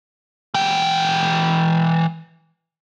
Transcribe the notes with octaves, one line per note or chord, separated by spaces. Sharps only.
E3 G5